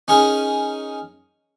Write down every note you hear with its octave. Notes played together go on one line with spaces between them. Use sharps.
C#4 D#4 G#4 A#4